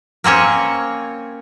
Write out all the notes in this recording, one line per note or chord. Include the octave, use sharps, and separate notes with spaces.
A#3 C4 C#4 C#5